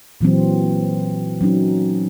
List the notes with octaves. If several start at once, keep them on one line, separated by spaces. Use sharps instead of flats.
A#2 E3 F#3 C4
F#3 C#4 D#4